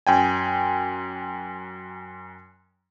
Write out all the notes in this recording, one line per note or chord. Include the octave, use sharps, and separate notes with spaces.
F#2 G5 G#5